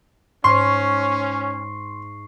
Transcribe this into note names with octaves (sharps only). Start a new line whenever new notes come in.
G#2 C#4 C6 C#6 C7